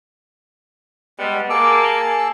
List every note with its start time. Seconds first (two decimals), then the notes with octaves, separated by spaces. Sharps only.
1.19 G3 G#3 B3 F#5
1.50 A#3 G#4 A5 D6 E6
1.96 G#5